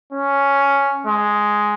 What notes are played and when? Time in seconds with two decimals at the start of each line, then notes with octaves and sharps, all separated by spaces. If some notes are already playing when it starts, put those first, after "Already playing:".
0.13 C#4
1.06 G#3